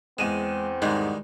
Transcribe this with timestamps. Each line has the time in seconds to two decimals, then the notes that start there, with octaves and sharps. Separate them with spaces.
0.19 E2 G#3 C4 D#7 E7
0.82 G#2 D#3 G3 G#3